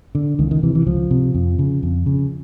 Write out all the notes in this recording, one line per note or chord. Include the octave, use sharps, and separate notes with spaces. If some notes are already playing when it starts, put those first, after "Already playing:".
D3
C#2 D#3
D#3
C3 E3
E3
C#2 F3
C3
F2
C#3
F2
C#3